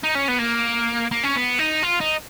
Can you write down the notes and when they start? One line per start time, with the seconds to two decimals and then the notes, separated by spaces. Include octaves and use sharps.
0.04 D#4
0.15 C#4
0.29 B3
0.39 A#3
1.11 A#3
1.23 C#4
1.36 B3
1.59 D#4
1.83 F4
2.01 D#4